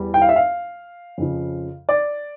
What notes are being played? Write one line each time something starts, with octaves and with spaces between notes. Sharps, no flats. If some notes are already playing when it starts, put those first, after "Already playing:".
Already playing: E2 E3 G3
G5
F5
E5
F5
F2 C#3 F3
D5